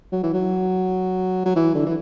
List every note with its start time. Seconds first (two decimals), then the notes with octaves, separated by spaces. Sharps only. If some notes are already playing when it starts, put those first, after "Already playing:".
0.12 F#3
0.23 E3
0.34 F#3
1.46 F#3
1.55 E3
1.75 D3
1.86 E3